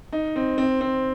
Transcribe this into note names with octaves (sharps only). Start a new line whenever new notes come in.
D#4
C4
C4
C4